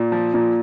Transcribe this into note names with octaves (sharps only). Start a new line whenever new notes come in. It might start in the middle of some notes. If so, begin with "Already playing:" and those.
Already playing: A#2
F3
A#2